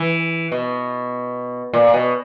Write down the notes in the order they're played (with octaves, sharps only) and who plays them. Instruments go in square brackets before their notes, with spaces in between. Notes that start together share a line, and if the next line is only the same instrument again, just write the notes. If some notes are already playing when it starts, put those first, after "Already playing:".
Already playing: [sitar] E3
B2
A#2
B2